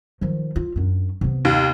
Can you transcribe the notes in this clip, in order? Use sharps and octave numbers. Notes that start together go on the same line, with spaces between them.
D#3 F3
F4
F#2 D4
C3 B3
D#2